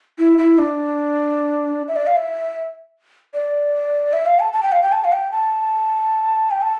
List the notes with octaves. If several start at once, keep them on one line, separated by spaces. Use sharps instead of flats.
E4
E4
D4
E5
D5
F5
E5
D5
E5
F5
A5
A5
G5
F5
G5
A5
F5
G5
A5
G5
A5